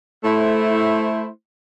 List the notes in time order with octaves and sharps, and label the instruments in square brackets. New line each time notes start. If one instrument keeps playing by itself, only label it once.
[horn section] A3 E4 C5